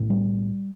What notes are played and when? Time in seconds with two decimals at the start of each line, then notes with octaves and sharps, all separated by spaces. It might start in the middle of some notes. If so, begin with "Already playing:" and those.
Already playing: B1 A2
0.10 G3